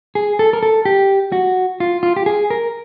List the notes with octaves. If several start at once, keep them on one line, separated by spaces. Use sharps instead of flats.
G#4
A4
A#4
A4
G4
F#4
F4
F4
G4
G#4
A#4